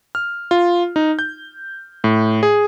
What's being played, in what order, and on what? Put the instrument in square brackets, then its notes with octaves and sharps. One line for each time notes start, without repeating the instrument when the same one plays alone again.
[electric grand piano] F6
F4
D#4
G6
A2
G#4